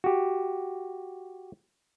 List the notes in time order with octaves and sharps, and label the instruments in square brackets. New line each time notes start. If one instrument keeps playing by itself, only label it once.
[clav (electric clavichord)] F#4 G4